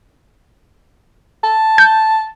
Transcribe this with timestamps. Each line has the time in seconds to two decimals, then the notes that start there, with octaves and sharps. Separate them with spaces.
1.44 A5
1.78 G6